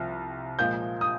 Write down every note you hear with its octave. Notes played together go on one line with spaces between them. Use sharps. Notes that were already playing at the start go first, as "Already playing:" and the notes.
Already playing: C2 C3 F3
A#2 F3 G#3 G6
D#6